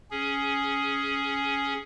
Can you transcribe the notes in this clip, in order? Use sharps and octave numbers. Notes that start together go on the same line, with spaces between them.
C#4 G#4